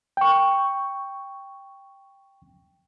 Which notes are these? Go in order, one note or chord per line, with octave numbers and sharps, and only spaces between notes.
G5 C#6